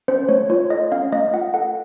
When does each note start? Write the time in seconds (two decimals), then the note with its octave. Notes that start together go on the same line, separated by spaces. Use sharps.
0.08 C#4 C5
0.29 A3 C#5
0.50 F4 C#5
0.70 A4 D#5
0.92 C#4 F5
1.12 A3 D#5
1.33 F4 F#5
1.54 A4 F#5